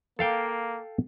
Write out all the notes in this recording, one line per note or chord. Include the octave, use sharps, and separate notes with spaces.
A#3 A4 F5 G5